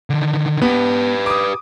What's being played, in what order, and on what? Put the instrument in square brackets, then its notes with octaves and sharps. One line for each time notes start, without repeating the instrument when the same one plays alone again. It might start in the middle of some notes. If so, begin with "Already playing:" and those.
[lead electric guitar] D3 D#3
[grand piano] B3 [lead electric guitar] G4 B4
[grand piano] D6 D#6